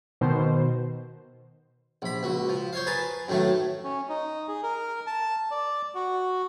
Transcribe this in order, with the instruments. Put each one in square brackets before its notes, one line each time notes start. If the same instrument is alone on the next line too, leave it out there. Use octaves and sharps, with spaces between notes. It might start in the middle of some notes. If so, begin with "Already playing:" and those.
[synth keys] B2 D#3 C5
[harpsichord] A#1 B5
C#2 F#4
F3
C5 C#5 F5
G#4 A#4 B4 A5
F#2 A2 D#3 A3
[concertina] C#4
D#4
G#4
A#4
A5
D5
F#4